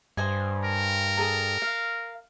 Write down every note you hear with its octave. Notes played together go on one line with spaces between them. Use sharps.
G2 C5 D#5 G#5
A#4
G#4 A4 A#5
F5